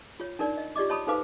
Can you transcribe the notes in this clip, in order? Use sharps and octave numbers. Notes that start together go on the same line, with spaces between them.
F4 C#5
D4 D#4 A#4 D5
D#5
F4 G4 D5 D#5 D6
C#5 D#5 A5 B5 C6 D#6
D#4 A4 B4 C5 F5 D6